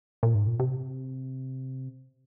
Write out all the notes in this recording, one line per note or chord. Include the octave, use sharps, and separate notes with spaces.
A#2
G#2
A#2
C3